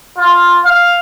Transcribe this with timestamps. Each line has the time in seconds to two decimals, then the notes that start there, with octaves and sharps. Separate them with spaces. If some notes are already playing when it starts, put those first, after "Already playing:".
0.17 F4
0.65 F5